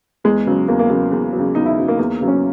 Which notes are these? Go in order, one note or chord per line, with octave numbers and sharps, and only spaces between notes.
E2 G#3
C#3 F#3
E2 A#3
A#3
C#3 F#3 A#3
E2
F#3
C#3
E2 D#4
E4
C#3 F#3
A#3
E2 A#3
C#3 F#3
C#4